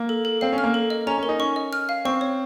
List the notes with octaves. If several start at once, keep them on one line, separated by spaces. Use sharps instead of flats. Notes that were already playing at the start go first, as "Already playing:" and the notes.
Already playing: A#3
A4
A4
C4 F5
C#4
F6
A#3
A4
D#5
C#4 A#5
C#4 A#4
D#4
C#4 C#6
D#5
F6
F5
C4 C#6
C#5